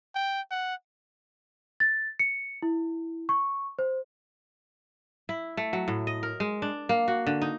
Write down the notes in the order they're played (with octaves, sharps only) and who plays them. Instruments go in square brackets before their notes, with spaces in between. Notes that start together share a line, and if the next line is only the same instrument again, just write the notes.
[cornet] G5
F#5
[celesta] A6
C#7
E4
C#6
C5
[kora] E4
A3
F#3
A2
D#5
A#4
G#3
D4
A#3
F#4
D3
D#4